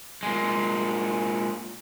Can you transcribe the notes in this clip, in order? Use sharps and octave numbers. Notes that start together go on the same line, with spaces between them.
A#2 G#3